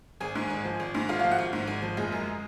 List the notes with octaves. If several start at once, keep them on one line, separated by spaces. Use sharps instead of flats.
G#1 G#4 G#5
G#2
G#1
F3
G#1
G#2
G#1 F4 F5
F3 F4 F5
F#4 F#5
G#1
G#2
G#1
F3
F#1 G#3 G#4
F#2